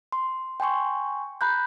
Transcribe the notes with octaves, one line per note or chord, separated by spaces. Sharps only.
C6
G5 G#5 C6 C#6
A#5 B5 F#6 G6